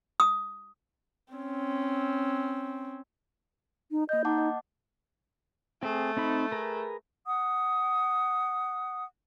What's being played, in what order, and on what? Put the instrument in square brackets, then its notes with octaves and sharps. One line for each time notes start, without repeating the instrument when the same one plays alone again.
[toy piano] D#6
[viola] C4 C#4
[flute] D#4
[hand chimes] A#3 G6 [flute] D#5
[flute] D#4 [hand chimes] F#5 A5 D6
[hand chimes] D#5
[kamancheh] A3 [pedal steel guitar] C4 G#4
[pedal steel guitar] C4 D#4 B5
G#4 A#4 B4
[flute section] F#5 D#6